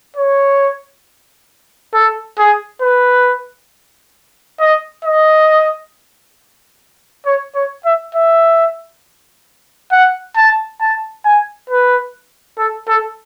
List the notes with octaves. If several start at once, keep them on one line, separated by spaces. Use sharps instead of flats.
C#5
A4
G#4
B4
D#5
D#5
C#5
C#5
E5
E5
F#5
A5
A5
G#5
B4
A4
A4